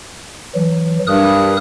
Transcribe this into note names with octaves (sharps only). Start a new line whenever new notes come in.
E3 F#3
G2 A#4 D#6 F#6